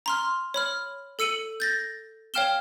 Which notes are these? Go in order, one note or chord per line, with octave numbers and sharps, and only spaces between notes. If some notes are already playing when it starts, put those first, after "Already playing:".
A#5 C6 F6
C#5 B5 F6
A4 E6 C#7 D#7 F#7
G6 A6 A#6
C#5 F5 G5 F6 E7 G7